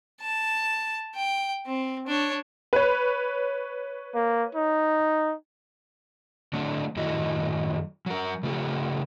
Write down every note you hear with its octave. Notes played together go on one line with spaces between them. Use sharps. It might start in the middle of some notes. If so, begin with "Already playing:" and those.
A5
G5
C4
D4 C#5
B4 C#5
A#3
D#4
D3 F#3 A3 C4 D4
F#2 A2 D#3 E4 F#4 D#5
F#3 A#4
C#3 A3 F4 G4